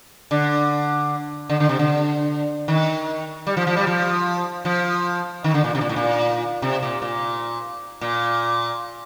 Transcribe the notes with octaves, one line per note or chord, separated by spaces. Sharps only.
D3
D3
D3
C3
D3
D#3
G3
F3
F3
G3
F3
F3
D#3
D3
A#2
C3
A#2
A2
A#2
C3
A#2
A#2
A#2